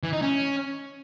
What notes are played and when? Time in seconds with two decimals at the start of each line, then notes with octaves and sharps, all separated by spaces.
0.03 E3
0.13 D#4
0.22 C#4